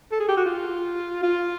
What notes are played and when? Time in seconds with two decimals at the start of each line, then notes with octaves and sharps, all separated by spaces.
0.12 A4
0.20 G#4
0.28 G4
0.37 F#4
0.46 F4
1.23 F4